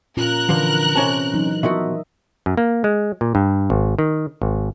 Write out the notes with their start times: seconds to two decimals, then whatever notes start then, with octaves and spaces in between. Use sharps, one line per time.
0.17 A#2 C#4 F4 A#4 F#6
0.49 D3 E3 F3 B4
0.96 C3 C#4 C5 A5
1.33 E3 F#3 D#4
1.63 B2 F3 F#4 A#4 D#5 E5
2.46 F#2
2.57 A#3
2.84 G#3
3.21 A#2
3.35 G2
3.70 G#1
3.99 D#3
4.42 G#1